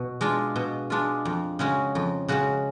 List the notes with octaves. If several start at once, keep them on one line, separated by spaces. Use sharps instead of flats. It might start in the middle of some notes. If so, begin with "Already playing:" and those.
Already playing: B2
G#3 D4 F4
B2
G#3 D4 F4
F2
C#3 G#3 C#4 F#4
F2
C#3 G#3 C#4 F#4